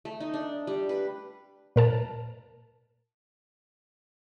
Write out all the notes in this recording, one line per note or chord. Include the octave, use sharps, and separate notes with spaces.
A3
D#4
D4
G3
B4
A#2 A#4 A5